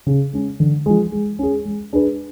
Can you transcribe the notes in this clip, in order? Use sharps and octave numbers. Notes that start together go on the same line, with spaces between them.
C#3
G#3 C#4
D3
F3 G#3
G#3
C#4 G#4
G#3
D4 G#4 B4